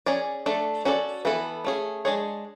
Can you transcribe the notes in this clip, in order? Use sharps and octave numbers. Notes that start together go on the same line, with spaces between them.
C#4 G#4 D5
A3 D4 A4
C#4 F#4 A4 D5
E3 B3 E4 A4
A3 C#4 G#4
G#3 D4 G#4 C#5